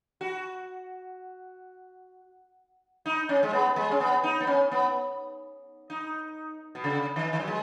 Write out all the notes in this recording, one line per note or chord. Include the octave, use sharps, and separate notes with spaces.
F#4
D#4
C#4
G#3
B3
G#3
C#4
B3
D#4
B3
C#4
B3
D#4
B2
C#3
D#3
D#3
F#3
G#3